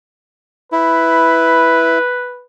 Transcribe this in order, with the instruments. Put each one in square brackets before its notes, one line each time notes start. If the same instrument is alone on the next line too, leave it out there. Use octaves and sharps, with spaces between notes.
[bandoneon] E4 [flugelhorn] B4